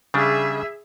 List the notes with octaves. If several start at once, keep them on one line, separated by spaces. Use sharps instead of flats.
C#3 G3 D4 G#4 E5